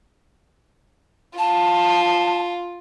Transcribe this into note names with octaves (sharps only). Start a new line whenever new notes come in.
F4 A5